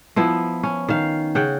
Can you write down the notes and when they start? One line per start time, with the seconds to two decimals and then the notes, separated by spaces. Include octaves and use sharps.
0.16 F3 B3 E4
0.63 C#4
0.89 D#3 F5
1.35 C#3 F#5 G5